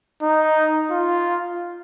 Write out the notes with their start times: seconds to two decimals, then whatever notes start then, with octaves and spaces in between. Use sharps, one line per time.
0.23 D#4
0.91 F4